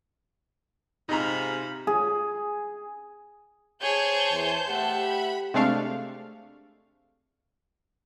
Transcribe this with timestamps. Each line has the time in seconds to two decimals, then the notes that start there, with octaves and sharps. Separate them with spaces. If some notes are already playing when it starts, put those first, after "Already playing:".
1.09 G#2 C3 D#4 F4 A#5 B5
1.87 G#4
3.82 G#4 C5 C#5 A5 G6
4.31 E2 E3
4.68 A3 G4 E5 F#5
5.04 B5
5.54 C3 G#3 A3 D4 F5 C#6